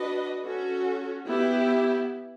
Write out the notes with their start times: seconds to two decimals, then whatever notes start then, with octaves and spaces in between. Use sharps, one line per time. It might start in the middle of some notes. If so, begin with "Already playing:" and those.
Already playing: D4 F#4 B4 D#5
0.43 C#4 F#4 A4
1.25 B3 E4 G4